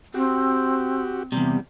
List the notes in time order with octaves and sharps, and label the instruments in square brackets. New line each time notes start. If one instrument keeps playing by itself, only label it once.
[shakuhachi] C4 [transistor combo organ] F#4 G4
[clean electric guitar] E2 C3 [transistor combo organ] G3